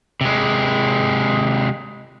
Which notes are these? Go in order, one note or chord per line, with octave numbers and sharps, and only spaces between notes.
C3 G#3